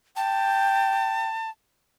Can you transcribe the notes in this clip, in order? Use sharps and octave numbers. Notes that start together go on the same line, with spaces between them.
G5 A5